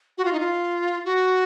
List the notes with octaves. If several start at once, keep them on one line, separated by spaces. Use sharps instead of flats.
F#4
F4
D#4
F4
F#4